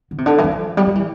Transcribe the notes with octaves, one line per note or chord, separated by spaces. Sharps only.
D3
C3
D3
E3
F3
G3
F3
E3